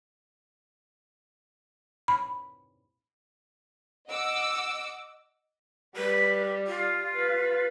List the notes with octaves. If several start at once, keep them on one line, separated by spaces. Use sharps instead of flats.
B5
D#5 F#5 D6 E6
G3 B4
F4
B4